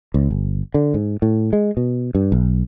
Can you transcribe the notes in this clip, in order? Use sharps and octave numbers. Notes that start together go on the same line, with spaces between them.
C#2
G1
D3
G#2
A2
G#3
B2
G2
B1